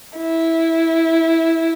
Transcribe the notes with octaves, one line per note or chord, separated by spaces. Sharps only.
E4